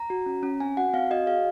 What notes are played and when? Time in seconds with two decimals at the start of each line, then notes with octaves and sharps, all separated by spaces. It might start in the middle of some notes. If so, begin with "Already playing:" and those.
Already playing: A#5
0.10 F#4
0.26 C#4
0.43 C#4
0.60 C4 G#5
0.77 F#4 F#5
0.94 C4 F5
1.11 F#4 D#5
1.27 G#4 F5